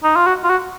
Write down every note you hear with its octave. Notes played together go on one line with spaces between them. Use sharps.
D#4
F4
F#4
F4
F#4